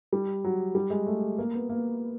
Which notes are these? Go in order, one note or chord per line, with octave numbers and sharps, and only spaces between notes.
G3
F#3
G3
G#3
A3
A#3
B3
A#3